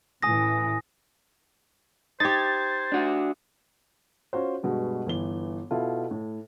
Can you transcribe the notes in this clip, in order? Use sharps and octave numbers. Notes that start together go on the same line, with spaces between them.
A1 A2 E3 G#5 D#6 A#6
D#4 G4 C5 G#6 A6
D4 F#4
C#4 F4 F#4 C5
G2 B2 G#3 F#4
G1 E3 G7
B2 E4 F4 A4
A2